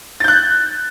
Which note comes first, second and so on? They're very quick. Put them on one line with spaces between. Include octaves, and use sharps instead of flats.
A6 G6 F#6